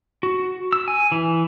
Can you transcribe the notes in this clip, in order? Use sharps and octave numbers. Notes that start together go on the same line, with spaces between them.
F#4
E6
G#5
E3